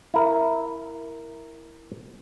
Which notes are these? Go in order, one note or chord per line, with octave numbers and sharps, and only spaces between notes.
E4 A#4